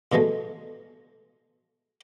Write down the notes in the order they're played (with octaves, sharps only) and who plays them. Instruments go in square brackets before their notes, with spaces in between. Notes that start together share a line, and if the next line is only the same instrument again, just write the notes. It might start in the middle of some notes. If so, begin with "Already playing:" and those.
[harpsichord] G2 B2 F3 G#3 A3